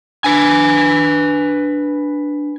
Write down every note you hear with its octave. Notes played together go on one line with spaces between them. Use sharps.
D4 B4 G#5